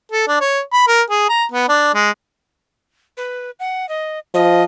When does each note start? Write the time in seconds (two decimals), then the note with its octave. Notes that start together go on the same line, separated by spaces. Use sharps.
0.12 A4
0.28 D4
0.41 C#5
0.73 B5
0.87 A#4
1.10 G#4
1.29 A#5
1.52 B3
1.69 D4
1.94 G#3
3.17 B4
3.60 F#5
3.89 D#5
4.34 F3 D#5